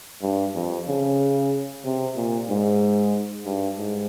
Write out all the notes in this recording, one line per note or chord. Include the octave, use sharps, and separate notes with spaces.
G2
F2
C#3
C3
A#2
G#2
G2
G#2